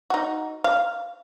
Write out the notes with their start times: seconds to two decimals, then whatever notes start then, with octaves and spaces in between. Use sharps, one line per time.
0.10 D#4 F#4
0.64 F5